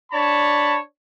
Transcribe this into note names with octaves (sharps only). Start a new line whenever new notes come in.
D4 C#5 A5 B5